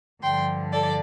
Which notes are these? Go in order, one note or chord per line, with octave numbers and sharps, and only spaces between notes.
G2 D3 F3 G5 C6
A4 D5